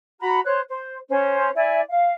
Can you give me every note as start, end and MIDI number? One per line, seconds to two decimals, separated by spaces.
0.20 0.40 66
0.20 0.40 82
0.20 0.40 83
0.44 0.59 72
0.44 0.59 73
0.44 0.59 90
0.69 0.97 72
1.09 1.49 61
1.09 1.49 72
1.55 1.80 64
1.55 1.80 74
1.55 1.80 76
1.55 1.80 80
1.89 2.14 77